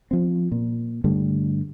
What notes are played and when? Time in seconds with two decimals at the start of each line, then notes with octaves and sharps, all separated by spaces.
0.11 F3 C4
0.52 A#2
1.04 G2 D3 G3 A3